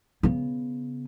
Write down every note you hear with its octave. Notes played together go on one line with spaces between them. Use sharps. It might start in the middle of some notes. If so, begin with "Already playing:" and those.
C#3 B3